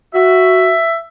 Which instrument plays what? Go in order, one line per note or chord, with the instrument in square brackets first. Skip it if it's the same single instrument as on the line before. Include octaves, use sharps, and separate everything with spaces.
[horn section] F#4 [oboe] E5